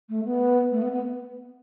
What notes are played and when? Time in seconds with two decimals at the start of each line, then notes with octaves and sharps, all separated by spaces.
0.09 A3
0.25 B3
0.72 A3
0.82 B3
0.92 B3